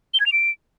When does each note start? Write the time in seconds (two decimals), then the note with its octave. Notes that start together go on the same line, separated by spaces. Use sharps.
0.14 G7
0.20 G#6
0.26 F7
0.32 D7